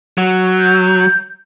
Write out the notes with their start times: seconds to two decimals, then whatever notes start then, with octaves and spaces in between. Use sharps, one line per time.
0.18 F#3
0.58 G6